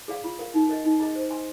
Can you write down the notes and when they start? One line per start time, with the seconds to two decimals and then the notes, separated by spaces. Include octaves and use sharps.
0.08 G#4 D5 F5
0.24 F4
0.39 A#4 F5
0.54 D#4
0.69 A#4 D#5
0.85 D#4
1.00 G#4 D#5 A#5
1.15 C5
1.30 D#5 G#5 C6